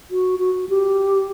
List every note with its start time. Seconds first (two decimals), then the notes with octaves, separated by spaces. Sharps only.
0.11 F#4
0.39 F#4
0.69 G4